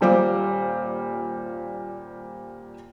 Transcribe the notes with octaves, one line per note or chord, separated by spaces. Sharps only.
D#1 A#2 G3 C5 F5 D6